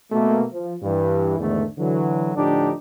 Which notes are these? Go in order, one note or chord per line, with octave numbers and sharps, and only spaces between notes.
B2 A3 A#3
F3
G2 E3
E2 G#2 D3 D#3 A3
D3 E3 F#3
A2 D3 F3 D4 D#4 G4